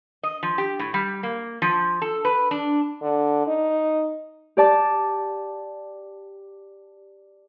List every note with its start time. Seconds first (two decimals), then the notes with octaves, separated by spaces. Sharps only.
0.23 D#5
0.43 F3
0.58 G4
0.79 A2
0.94 G3
1.23 A#3
1.62 F3
2.02 A4
2.25 B4
2.51 D4
3.02 D3
3.47 D#4
4.57 G4 D5 A5 D6